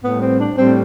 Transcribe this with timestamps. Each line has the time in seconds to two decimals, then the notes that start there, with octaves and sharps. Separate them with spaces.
0.03 A2 G3 B3
0.22 C4
0.39 D4
0.57 A2 G3 C4